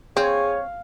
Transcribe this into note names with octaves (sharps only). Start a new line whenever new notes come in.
C4 G#4 C#5 F5